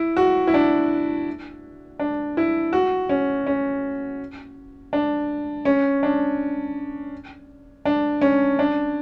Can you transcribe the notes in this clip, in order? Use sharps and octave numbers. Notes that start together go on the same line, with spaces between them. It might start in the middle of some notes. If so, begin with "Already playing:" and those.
Already playing: E4
F#4
E4
D4
D4
E4
F#4
C#4
C#4
D4
C#4
D4
D4
C#4
D4